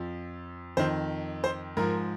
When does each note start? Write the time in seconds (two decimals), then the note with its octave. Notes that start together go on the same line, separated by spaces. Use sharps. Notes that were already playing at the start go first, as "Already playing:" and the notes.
Already playing: F2 F3
0.77 F2 D#3 C5
1.44 C5
1.77 G#2 F3 A#4